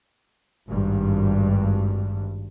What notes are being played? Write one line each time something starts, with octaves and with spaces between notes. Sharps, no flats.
G#1 G2